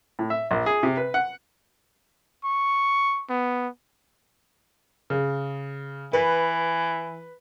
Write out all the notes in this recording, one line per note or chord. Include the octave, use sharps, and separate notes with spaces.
A2
E5
A#1
G#4
C3
B4
F#5
C#6
B3
C#3
E3 B4